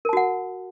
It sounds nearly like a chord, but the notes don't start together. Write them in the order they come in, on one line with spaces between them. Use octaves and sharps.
A#4 A5 F#4 F#5